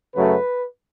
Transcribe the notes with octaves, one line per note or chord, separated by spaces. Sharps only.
F#2 C#3 F#3 A3 B4